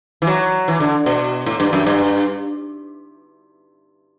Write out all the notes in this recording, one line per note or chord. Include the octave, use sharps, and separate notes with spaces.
E3
F#3
E3
D3
B2
A2
G2
F#2
G2